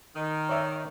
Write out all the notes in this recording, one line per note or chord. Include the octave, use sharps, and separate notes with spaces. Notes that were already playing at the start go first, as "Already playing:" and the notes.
D#3
C#5 D5 E5